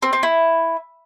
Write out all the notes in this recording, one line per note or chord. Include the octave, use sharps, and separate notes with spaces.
C4
C4
E4